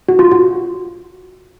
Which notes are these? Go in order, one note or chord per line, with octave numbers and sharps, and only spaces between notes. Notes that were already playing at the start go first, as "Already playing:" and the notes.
F#4
F4
F#4